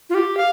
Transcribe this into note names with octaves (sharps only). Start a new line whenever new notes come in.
F4
G4
F5